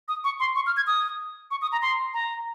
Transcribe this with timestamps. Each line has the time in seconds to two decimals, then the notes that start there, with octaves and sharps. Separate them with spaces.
0.08 D#6
0.24 C#6
0.40 C6
0.56 C#6
0.67 F6
0.77 G#6
0.87 D#6
1.51 C#6
1.62 D#6
1.72 A#5
1.82 C6
2.14 A#5